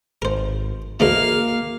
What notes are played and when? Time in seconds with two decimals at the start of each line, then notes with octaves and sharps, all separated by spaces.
0.22 G#1 A#4 C5
1.00 D2 G#2 E3 A#3 F5